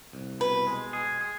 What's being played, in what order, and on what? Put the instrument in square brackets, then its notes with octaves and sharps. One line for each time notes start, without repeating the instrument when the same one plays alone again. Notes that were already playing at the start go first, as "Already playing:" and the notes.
[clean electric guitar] C2
[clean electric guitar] B2 [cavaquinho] B4
[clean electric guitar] G#3
G#4
G#4